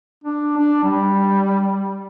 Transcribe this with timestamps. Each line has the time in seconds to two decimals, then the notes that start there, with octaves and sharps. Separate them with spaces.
0.24 D4
0.57 D4
0.83 G3